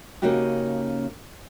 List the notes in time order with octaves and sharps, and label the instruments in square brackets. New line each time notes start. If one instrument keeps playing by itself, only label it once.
[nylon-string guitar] C#3 A#3 C#4 D#4 F#4 G4